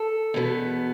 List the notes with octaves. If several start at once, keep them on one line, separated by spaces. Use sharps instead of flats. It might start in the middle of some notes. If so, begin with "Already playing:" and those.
Already playing: A4
E2 B2 B3